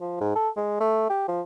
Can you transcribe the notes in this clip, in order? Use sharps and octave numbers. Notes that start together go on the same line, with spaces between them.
F3
G#2
A4
G#3
A3
G4
F3